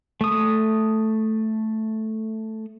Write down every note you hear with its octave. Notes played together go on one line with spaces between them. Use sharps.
A3 D#6